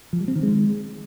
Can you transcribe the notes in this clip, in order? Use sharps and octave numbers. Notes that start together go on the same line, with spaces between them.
F3
G3
C4
D#3
G#3